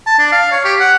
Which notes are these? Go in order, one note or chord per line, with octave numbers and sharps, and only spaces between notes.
A5
D4
F5
C#5
G4
F#5